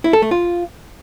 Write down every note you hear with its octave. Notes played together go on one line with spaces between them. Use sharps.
E4
A4
A3
F4